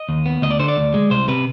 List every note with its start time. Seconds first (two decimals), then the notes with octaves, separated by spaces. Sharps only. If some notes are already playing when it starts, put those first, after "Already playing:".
Already playing: D#5
0.09 D#2
0.26 B3
0.42 D2 D#5
0.51 D5
0.59 D3 C5
0.68 D5
0.77 D2
0.94 G#3
1.11 C2 C5
1.28 C3 B4